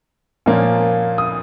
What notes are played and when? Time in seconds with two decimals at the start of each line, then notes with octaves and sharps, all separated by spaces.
0.46 A#2 F3 A#3 C#4
1.18 D#6